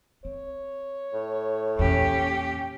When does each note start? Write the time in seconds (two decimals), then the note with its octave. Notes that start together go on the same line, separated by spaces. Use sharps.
0.25 C4 C#5
1.13 A2
1.79 E2 A#2 C#4 G4